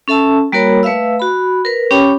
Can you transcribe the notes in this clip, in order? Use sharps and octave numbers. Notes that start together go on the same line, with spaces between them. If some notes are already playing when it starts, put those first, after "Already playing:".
C#4 A4 E5 A5 E6
G3 A#3 F#4 A#4 C#5 B5
A3 B4 E5 F5 E6
F#4 B5
A#4 B4
C#4 G4 C#5 G5 B5 D6